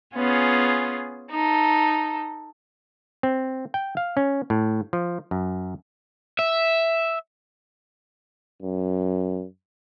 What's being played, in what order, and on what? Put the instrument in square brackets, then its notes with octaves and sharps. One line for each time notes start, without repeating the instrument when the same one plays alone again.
[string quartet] B3 C#4 F4 G#4
D#4 A4
[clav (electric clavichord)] C4
G5
F5
C#4
A2
F3
F#2
[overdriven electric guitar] E5
[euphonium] F#2